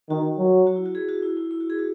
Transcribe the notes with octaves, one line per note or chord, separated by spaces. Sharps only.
D#3 F#4
F#3
F#4
E4
F#4
G#4
F#4
E4
E4
E4
F#4
G#4
F#4